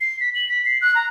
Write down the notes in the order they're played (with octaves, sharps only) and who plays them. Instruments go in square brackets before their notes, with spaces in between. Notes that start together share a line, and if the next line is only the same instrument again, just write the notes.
[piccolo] C7
B6
F#7
B6
C7
F#6
A#5